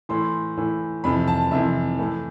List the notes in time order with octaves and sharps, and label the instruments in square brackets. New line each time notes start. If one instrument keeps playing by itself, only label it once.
[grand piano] A2 E3 C6
A2 E3
F2 C3 E3 B5
A5
F2 C3 E3 E5
A2 E3